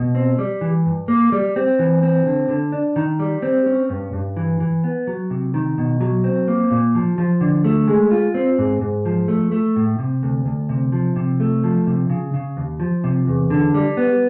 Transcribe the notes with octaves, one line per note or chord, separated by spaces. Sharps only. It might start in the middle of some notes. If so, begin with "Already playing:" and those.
Already playing: B2
C4
G3
E3
G2
A#3
G3
C4
E3
C4
D3
D3
D4
D#3
G3
C4
C#4
G2
G2
E3
E3
B3
F#3
C3
D#3
B2
F#3
C4
A#3
A#2
F3
F3
D3
A3
G#3
F4
C4
G#2
G#2
F3
A3
A3
A2
C3
D2
D2
C3
F3
C3
A3
F3
C3
C#3
C#3
D#2
F3
C3
E2
D3
G3
B3